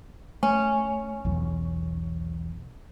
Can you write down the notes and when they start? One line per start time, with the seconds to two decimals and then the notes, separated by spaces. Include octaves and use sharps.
0.43 A3 C#4
1.25 B1 E2